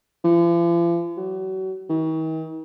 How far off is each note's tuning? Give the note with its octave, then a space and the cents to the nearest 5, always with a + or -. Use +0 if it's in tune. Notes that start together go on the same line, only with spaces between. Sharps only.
F3 -45
F#3 +35
D#3 +45